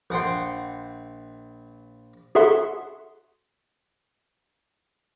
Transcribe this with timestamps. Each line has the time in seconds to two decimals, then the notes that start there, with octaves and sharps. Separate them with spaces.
0.10 A#1 F#5 G5 C6
2.35 F#4 G#4 A4 E5 F#5 C6